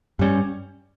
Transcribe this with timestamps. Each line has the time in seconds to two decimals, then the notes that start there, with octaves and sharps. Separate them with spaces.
0.19 G2 G3 C#4